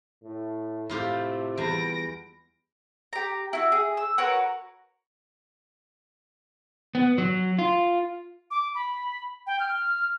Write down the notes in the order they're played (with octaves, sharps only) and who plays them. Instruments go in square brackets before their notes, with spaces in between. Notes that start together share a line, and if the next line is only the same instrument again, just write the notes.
[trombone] A2
[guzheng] A2 F4 G4 [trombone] C3 [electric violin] A3
[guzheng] E2 G3 [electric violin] A#6 D7
[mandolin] G4 A#5
E4 F#4
G#4
E6
F#4 A#4 B4 C#5
[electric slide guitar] B3
F#3
F4
[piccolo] D6
B5
G5
F6